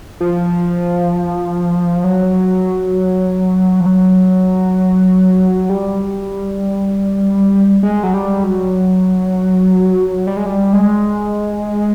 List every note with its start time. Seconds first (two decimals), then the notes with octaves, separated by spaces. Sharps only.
0.20 F3
2.04 F#3
3.80 F3
3.86 F#3
5.70 G3
7.83 G#3
8.03 F#3
8.14 G3
8.44 F#3
10.27 G3
10.37 G#3
10.46 G3
10.73 G#3